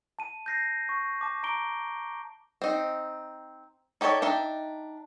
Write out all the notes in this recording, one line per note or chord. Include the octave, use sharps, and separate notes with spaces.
A5 D#7
G6 A#6 C7
C#6
A5 D6
A#5 D6 D7 G7
C4 D#4
D#4 G4 A4 C#5 D5
D4 D#4 E5 G5